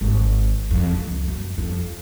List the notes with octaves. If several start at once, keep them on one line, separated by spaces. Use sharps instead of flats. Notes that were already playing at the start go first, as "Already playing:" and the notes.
G#1
F2
C#2
F#2
F2